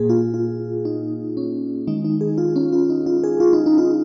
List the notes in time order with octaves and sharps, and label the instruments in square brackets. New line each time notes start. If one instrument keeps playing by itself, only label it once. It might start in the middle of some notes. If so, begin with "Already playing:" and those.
Already playing: [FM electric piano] A#2 A#3 G#4
F4
F4
D#4
C#4
D#3 G#3 D#4
D#4
G#4
F4
C#4
F4
D#4
F4
G#4
F4
D#4
D#4
F4